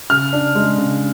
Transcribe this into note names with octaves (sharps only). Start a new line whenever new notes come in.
C#3 F6
D4
G#3
C#3